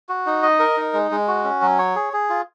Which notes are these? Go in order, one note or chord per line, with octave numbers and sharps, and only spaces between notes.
F#4
D#4
D#5
A#4
D#4
G#3
G#3
F#4
C#4
F#3
C#5
G#4
G#4
F4